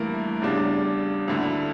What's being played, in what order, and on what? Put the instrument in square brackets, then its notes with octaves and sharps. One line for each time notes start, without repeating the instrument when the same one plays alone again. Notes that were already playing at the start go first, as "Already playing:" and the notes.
Already playing: [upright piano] G2 E3 A#3 E4 A#4 [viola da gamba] A3
[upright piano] E2 C#3 G3 D4
[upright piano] D2 D3 A3 E4 [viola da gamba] A#3